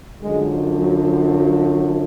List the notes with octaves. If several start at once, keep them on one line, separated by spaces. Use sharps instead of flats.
F#2 D3 F3 G#3
F#3
F#3